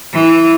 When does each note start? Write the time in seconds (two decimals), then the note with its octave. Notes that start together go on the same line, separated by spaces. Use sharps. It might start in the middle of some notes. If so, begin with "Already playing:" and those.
0.13 E3